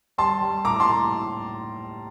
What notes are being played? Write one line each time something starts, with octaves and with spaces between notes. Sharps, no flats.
G3 A5 C6
G3
A2 A#5 D6
A5 C6
A2